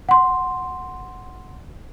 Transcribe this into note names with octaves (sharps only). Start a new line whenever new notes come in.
F#5 C6